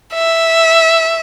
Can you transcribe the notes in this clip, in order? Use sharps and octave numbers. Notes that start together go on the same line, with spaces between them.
E5